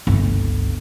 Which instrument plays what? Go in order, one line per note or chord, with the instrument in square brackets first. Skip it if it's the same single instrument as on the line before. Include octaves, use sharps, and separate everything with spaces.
[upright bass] G1 C#2